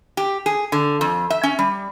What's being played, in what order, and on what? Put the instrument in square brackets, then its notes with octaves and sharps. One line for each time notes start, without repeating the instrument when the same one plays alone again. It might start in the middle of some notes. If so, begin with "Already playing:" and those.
[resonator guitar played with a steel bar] G4
G#4
D3
F2
E5
C#4
G3